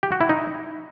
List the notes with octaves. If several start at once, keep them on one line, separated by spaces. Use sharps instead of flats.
G4
F#4
E4
D#4